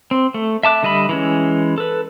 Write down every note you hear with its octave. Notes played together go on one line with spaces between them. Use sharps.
C4
A3
E5 A5 D6 F#6
D3 G3 D#5 E5 B5
E3 G#3 C#4
A4 B4